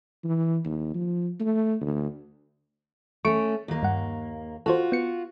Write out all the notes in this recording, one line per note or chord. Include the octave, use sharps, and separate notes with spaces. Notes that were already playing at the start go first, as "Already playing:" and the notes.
E3
D#2
F3
A3
D2
A3 C#4 C#6 D7
D#2 A#3
G2 F#5
F4 F#4 A4 C5
B3 C#7